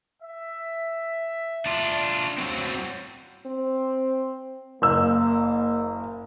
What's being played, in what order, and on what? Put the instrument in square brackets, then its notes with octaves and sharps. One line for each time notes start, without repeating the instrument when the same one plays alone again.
[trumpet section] E5
[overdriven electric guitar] D4 F4
F#3 C4
[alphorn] C4
[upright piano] F#1 E6 [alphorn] A#3